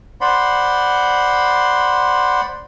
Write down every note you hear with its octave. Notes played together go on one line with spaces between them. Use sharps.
C5 D5 F#5 B5 C6